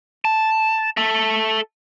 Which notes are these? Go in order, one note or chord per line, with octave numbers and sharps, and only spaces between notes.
A5
A4 E5